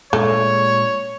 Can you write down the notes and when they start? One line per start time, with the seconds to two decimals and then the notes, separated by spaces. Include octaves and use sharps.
0.13 A#2 G#3 A3 D4 C#5